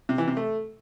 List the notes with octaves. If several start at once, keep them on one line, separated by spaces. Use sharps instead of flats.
C3
E3
C3
A3